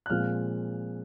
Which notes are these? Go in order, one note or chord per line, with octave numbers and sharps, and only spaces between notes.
F#6
A#2 F3 G#3 C4 F6